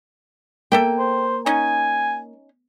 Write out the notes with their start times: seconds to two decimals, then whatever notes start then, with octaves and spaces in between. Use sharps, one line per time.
0.72 A#3 A4 E5 G5
0.99 C5
1.46 C#4 D#4 G#5